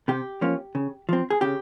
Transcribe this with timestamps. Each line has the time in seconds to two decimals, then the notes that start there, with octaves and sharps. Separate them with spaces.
0.08 C3 G4
0.41 F3 A#3 C#4 F4
0.75 C#3
1.09 F3 C4
1.30 G#4
1.41 C#3 G4